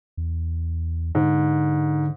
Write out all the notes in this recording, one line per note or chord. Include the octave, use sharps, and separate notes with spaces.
E2
G#2 D3